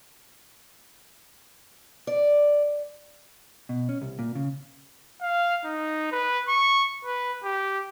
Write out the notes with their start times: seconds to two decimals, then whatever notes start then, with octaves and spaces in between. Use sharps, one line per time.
2.07 D5
3.69 B2
3.89 C#4
4.02 C2
4.19 A#2
4.35 C#3
5.21 F5
5.65 D#4
6.12 B4
6.48 C#6
7.05 B4
7.44 G4